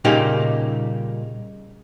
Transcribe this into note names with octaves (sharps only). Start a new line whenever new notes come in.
A#2 C#3 G3 A#3 D#4 G4